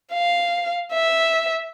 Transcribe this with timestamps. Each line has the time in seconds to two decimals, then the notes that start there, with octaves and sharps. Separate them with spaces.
0.13 F5
0.93 E5